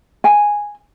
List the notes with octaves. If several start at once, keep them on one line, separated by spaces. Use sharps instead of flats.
G#5